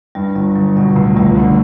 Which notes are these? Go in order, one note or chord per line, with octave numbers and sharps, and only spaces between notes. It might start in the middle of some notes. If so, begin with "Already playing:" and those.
G2 G3
G1 G3
G1 F#3
B2 G3
C#2 A3
C#2 G3
D3 A3